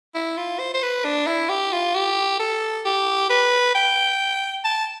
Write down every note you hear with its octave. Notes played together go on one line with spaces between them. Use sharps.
E4
F4
C5
C5
B4
D4
E4
G4
F4
G4
A4
G4
B4
G5
A5